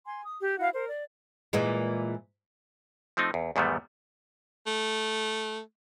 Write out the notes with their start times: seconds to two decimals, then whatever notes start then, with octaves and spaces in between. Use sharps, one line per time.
0.06 G#5 C6
0.24 D#6
0.40 G4
0.59 E4 F#4 F5
0.73 A#4 C5
0.89 D5
1.53 A#2 E3 G#3
3.17 F3 A3 C4 D#4
3.34 E2
3.56 E2 G#2 D#3 G3 A3 B3
4.67 A3